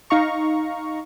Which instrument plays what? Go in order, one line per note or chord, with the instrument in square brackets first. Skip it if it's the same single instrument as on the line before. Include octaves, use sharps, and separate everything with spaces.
[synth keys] D#4 F5 A#5 C#6